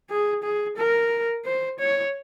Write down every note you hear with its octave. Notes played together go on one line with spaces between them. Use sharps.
G#4
G#4
A#4
C5
C#5